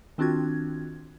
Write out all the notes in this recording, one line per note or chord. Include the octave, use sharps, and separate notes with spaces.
D#3 C4 D4 F4 F#4 G#6